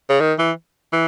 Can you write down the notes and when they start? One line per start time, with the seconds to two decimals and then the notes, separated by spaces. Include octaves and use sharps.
0.09 C#3
0.20 D#3
0.39 E3
0.92 E3